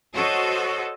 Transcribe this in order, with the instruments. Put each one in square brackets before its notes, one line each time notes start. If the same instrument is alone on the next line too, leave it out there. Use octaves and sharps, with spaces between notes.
[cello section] F#4 A4 C5 C#5 D#5